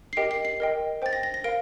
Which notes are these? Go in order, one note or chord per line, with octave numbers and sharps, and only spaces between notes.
C7
G4 A#4 D#5 G5 D7
C7
C7
A#4 D#5 G5
C5 G5 A6
A#6
A#6
A#6
A#4 F5 D7